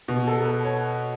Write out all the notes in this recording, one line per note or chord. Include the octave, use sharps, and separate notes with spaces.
B2
A4
A4
B4
C#5